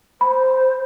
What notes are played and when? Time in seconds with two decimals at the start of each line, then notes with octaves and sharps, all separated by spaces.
0.21 C5 B5